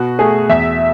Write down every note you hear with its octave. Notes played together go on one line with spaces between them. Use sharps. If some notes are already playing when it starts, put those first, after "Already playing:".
Already playing: B2 F#4
A3 G#4
E2 E5